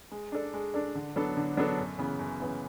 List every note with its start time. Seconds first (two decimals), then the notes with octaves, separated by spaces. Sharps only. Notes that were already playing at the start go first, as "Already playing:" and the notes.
0.12 G#3
0.32 D4 A4 D5
0.54 G#3
0.74 D4 A4 D5
0.95 D3
1.16 F#3 B3 D4 A4
1.37 D3
1.57 F#3 B3 D4 A4
1.78 F#2
1.99 C#3 E3 B3
2.19 F#2
2.40 C#3 E3 B3